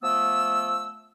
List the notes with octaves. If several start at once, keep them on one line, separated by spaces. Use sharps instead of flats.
F3 A3 B3 E6